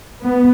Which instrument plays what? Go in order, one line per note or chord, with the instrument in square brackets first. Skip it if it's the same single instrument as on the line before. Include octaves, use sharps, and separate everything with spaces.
[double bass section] B3